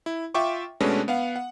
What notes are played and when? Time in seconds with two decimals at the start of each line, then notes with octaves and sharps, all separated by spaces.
0.06 E4
0.34 F4 E5 G5 C#6 D6
0.80 B2 G#3 A3 C#4 D4 B4
1.08 B3 F5 F#5
1.36 F#5